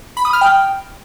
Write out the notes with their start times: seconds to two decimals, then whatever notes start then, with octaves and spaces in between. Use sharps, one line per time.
0.17 B5
0.25 D#6
0.33 F6
0.41 G5